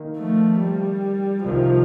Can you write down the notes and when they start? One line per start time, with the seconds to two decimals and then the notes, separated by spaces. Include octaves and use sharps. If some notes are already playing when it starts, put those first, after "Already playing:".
Already playing: D#3 A#3 D#4
0.17 F3 A3
0.59 G3
1.44 C2 C3 D#3 F3